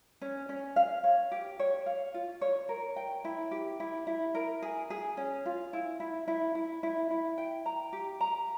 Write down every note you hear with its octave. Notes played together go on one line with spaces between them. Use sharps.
C#4
C#4
F5
C#5
G4
C#5
F5
F4
C#5
A#4
G5
E4
G4
E4
E4
A#4
G#4
G#4
C#4
F4
E4
E4
E4
E4
E4
E4
G5
A#5
G4
A#5